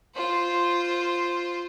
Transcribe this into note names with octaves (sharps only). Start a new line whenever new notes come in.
F4 C5